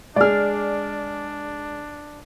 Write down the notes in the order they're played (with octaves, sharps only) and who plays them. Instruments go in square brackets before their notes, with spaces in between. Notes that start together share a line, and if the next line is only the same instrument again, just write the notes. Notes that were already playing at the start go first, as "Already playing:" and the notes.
[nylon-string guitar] G#3 G#4 [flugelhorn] D4 [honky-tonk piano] D5 F6